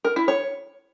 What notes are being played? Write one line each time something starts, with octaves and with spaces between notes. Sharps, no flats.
A#4
E4
C#5